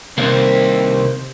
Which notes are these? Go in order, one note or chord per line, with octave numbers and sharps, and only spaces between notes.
C2 C3 D#3 A#3 C4 C5